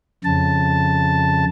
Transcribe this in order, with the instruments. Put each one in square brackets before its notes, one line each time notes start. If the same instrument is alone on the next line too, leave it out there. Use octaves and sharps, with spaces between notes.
[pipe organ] F2 C#3 A5